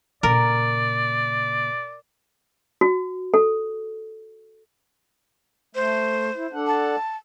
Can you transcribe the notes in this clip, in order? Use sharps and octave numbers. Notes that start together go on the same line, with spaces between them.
A#2 C#3 A#4 D5
F#4
A4
A3 C5
E4
D4 A4 F#5
A5